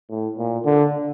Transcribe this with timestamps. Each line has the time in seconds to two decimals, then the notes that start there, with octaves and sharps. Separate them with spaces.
0.10 A2
0.38 A#2
0.65 D3